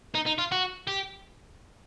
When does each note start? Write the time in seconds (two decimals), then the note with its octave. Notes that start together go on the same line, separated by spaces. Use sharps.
0.15 D#4
0.26 D#4
0.38 F4
0.52 F#4
0.87 G4